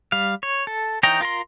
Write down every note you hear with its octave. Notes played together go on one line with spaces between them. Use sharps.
G3 F5
C#5
A4
E3 D#4 C#5 G5 A#5
F4 A#4 A#5 C6